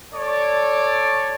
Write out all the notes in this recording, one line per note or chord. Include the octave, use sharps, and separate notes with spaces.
A4 C#5 D5